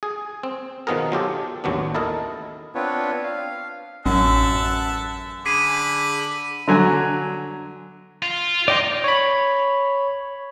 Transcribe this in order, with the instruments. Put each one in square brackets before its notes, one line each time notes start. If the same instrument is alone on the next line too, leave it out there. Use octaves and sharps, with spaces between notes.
[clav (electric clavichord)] G#4
C4
B2 D#3 F3 B3 G#4 A#4
F#3 F4 G4 A4
A1 D#2 F#3 B3 D4
E4 A4 A#4 D#5
[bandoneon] B3 C4 D4 F4 B4 C#5
F5
[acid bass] A1 [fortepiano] F#2 [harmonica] E5 F#5 A5
[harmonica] D3 B5 D6 [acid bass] G#4 [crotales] B6 D#7
[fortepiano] D3 F#3 G#5
[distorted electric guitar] F4
[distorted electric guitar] D#4 [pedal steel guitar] D5 G5 C6
[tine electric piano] C#5 B5